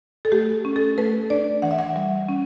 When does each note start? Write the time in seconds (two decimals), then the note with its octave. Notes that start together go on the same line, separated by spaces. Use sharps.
0.25 A4
0.32 A3 G4
0.65 C#4
0.76 A4
0.98 A3 B4
1.30 D4 D5
1.62 E3 F#5
1.71 E5
1.79 F#5
1.96 G3
2.29 C#4